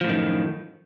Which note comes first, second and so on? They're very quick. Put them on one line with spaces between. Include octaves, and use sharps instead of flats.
F3 A2 F#2 D#3